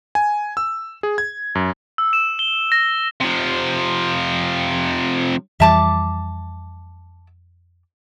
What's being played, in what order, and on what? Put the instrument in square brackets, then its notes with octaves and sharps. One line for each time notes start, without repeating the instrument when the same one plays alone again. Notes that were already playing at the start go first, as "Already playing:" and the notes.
[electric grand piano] G#5
E6
G#4
G#6
F#2
[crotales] E6
E7
G7
A#6
[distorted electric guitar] C3 F3
[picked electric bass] F2 E3 G3 [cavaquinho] E5 A5 D6